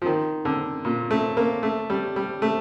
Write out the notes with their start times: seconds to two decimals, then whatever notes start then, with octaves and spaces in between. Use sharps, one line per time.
0.02 F3
0.06 D#3
0.45 D3
0.85 A#2
1.11 A3
1.37 A#3
1.63 A3
1.90 G3
2.16 G3
2.42 A3